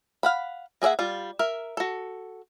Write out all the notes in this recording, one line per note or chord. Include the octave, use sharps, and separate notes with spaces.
F5 F#5 B5
A#3 G#4 D5 E5 F#5
G3 F4
A#4 E5
F#4 A4